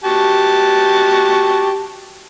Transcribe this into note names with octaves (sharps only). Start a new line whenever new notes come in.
F#4 G4 A5